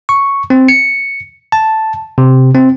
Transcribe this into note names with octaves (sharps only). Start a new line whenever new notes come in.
C#6
C4
C#7
A5
C3
C4